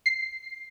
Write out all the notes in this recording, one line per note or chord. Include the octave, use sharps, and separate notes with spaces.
C7